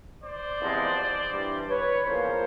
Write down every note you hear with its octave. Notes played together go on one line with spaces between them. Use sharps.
C5 D5
E2 C3 F3 G#3
G2 E3 G3
B4 C#5
E2 C#3 F3 A#3 C#4 A#4 C5